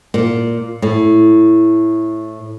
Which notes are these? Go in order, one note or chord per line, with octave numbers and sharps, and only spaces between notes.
A#2
A2